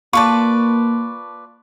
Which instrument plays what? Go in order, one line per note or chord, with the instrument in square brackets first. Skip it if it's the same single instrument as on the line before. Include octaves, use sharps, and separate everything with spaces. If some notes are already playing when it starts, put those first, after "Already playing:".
[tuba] A#3 [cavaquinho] F4 B4 D5 [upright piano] A5 C#6